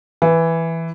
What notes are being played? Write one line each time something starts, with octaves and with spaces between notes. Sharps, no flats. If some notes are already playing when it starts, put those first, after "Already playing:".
E3